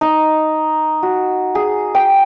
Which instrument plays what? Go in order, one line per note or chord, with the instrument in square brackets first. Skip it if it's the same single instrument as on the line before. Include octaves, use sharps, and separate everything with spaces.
[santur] D#4
F#4
G#4
G5